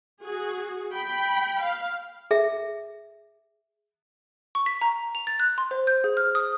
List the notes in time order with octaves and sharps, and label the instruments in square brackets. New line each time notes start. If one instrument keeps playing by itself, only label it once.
[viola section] F#4 G#4
G5 B5
F5
[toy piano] G#4 E5
[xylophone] C#6
B6
A#5
F7
A6
F#6
C6
C5
G6
G#4
F6
D#6